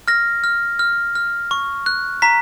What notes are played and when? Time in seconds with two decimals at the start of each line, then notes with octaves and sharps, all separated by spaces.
0.08 F6 A#6
0.44 F6
0.79 F6
1.15 F6
1.51 C#6
1.86 F#6
2.22 A#5 B6